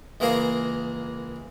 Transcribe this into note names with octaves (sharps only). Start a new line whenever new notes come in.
C#2 E3 A#3 G#4 A#4 F5